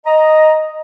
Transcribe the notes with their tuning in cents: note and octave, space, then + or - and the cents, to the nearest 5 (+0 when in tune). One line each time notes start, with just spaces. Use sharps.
D#5 +0 A#5 +10